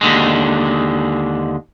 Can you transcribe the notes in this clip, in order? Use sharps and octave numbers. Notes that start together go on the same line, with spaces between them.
D#2 D3 G#3